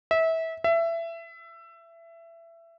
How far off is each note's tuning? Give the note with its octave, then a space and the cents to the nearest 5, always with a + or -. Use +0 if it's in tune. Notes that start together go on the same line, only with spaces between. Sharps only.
E5 -25
E5 +20